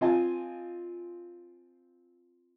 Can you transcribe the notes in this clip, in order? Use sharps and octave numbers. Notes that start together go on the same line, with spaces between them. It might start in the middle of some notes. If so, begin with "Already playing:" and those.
C4 F4 D#5 G#5 A5